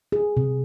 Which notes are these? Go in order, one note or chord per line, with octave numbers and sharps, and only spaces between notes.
G#4
C3